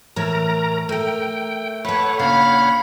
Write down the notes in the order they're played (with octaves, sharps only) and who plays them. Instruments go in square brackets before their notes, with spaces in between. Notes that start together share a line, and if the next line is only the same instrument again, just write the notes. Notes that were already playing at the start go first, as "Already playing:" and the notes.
[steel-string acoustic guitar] A2 E3 C#5 [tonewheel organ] A#4 A#5
[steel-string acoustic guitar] A3 A#4 [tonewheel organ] G5
[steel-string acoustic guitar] F4 A4 [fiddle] B4 [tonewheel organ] C#5 F#5
[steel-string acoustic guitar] A#2 C#3 D4 [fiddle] F5 B5